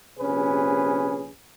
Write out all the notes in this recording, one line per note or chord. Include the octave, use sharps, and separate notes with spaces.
A#1 C3 C#4 G#4 B4